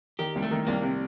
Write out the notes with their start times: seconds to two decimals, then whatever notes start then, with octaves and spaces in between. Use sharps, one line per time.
0.19 D#3 G4
0.36 C2 G3
0.42 A3
0.51 D#3
0.67 C2 A#3
0.83 C3